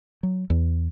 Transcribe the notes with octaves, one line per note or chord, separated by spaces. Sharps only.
F#3
E2